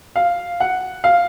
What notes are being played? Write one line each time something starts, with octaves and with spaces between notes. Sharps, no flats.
F5
F#5
F5